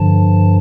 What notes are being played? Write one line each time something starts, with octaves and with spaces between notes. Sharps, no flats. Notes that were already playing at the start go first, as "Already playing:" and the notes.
Already playing: G2 D3 F3 A5